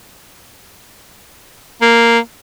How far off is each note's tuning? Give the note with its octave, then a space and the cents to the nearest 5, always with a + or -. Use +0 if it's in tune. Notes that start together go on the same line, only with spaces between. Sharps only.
A#3 -5